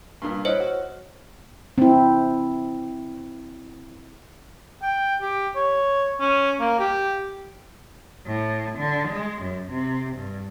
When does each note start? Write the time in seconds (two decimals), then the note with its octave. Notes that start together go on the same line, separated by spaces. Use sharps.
0.22 G2 A#2
0.45 E4 C5 C#5 D#5
0.60 F#4
1.78 C4 E4
4.82 G5
5.21 G4
5.56 C#5
6.20 C#4
6.60 A#3
6.79 G4
8.27 A2
8.78 D3
9.09 G#3
9.42 F#2
9.71 C3
10.17 G2